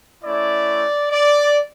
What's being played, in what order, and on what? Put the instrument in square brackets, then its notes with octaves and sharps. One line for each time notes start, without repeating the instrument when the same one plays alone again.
[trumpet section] A3 C#4 E4 D5
D5